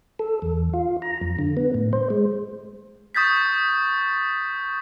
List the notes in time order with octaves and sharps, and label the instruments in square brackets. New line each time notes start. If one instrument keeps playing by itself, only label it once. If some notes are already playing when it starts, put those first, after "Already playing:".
[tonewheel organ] A4
E2
F4
A#5
F2
D3
B3
A2
C5
G#3
[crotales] C#6 D#6 G6 A6 B6